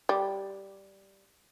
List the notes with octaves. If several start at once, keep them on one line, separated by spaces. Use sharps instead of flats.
G3